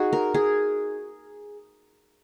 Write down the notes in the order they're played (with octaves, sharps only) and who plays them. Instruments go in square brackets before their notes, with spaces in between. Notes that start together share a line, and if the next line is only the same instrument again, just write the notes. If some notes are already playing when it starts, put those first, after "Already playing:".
Already playing: [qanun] C#4 D#4 F#4 G#4
A#4
G#4